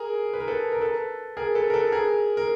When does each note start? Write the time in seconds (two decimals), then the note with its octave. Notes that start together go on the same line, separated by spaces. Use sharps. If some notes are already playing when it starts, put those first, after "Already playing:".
Already playing: G#4 A#4
0.34 B4
0.40 A#4
0.48 A4 B4
0.72 A#4
0.81 A4 B4
1.37 G#4 A#4
1.55 A4 B4
1.70 A#4
1.74 A4 B4
1.92 G#4 A#4
2.37 A#4